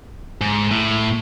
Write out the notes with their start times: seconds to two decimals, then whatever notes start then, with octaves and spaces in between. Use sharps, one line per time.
0.41 G#2
0.71 A2